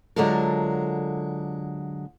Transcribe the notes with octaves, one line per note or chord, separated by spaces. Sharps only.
D3 F#3 G#3 F4 A4 A#4